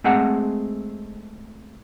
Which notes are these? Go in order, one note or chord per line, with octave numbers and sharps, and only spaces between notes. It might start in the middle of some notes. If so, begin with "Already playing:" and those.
G#3 A3 C4 G#4 F#5 A#5